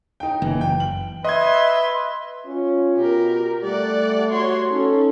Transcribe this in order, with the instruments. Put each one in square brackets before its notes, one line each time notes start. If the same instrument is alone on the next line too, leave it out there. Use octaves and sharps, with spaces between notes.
[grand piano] D#4 G5
[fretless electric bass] F#1 [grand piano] E3
[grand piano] G5
F#7
[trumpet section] B4 [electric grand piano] D#5 G#6 [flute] E5 [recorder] C6
[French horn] C#4 [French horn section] F4
[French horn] B2 [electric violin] G4 A#4
[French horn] G3 [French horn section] A3 [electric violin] D5 F#5
[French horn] F#4 [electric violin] C#5 C6
[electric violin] C#4 [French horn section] D#4 C#5 [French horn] A4